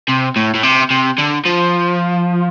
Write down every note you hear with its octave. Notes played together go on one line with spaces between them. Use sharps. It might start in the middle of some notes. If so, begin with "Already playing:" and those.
C3
A2
A2
C3
C3
D3
F3